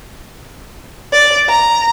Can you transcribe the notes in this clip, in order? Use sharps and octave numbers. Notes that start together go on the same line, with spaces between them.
D5
A#5